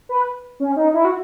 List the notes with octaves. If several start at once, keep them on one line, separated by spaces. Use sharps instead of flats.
B4
C#4
D#4
E4
F#4